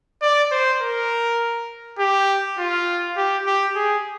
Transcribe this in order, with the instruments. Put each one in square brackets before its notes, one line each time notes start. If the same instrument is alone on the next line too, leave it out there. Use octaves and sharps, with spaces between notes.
[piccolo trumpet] D5
C5
A#4
G4
F4
G4
G4
G#4